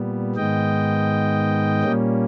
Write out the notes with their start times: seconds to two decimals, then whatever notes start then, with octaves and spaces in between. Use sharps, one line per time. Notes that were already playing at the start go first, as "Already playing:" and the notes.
Already playing: A#2 G3 B3
0.35 G#2 D#3 G#3 B3 D#5 G5
1.83 A#2 G3 A#3 C#4